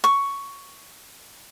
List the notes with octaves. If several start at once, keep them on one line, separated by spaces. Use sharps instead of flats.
C#6